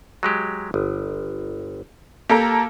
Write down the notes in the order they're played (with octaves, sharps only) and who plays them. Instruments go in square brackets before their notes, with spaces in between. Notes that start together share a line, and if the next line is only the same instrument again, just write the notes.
[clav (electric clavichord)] F#3 G#3 G4
G1
[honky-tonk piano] A#3 A4 A#5 [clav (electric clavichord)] G4